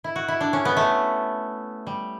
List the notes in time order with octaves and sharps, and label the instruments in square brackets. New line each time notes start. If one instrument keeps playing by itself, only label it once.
[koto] E4
F#4
E4
D4
C#4
B3
A3
G3